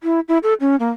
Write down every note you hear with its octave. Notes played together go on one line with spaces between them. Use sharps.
E4
E4
A4
C#4
A#3